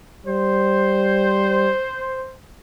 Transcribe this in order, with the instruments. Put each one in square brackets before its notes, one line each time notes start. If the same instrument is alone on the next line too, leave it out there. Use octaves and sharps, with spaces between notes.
[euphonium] G3 [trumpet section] C5